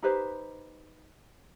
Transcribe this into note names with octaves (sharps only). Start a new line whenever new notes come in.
D#4 G4 B4 C5